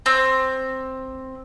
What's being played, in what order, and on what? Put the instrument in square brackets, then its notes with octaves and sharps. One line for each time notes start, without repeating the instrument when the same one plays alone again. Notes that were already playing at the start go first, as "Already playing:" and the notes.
[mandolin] C4